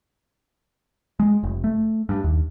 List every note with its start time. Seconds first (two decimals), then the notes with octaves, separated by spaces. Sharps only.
1.20 G#3
1.43 F1
1.64 A3
2.09 G2
2.24 D#2